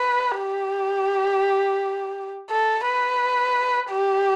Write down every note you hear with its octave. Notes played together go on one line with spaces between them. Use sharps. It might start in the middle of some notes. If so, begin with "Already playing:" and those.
Already playing: B4
G4
A4
B4
G4